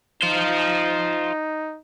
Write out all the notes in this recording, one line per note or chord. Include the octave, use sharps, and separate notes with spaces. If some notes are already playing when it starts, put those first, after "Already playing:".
D#4 F4 C5